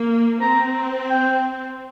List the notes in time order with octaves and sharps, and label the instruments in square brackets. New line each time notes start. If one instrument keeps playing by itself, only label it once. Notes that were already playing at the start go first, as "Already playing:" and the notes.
Already playing: [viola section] A#3
[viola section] C4 [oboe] A#5
[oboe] G5